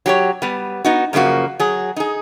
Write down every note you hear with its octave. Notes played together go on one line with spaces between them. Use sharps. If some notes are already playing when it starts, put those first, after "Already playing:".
F#3 G4 C#5
G3 B3
B3 D#4 F#4
F#2 C#3 F3 A#3 F#4
F#3 G#4
D#4 G#4